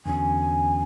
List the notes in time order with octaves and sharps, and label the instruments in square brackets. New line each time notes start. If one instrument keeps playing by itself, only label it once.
[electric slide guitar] E2 D3 F#3 C#4 [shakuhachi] G#5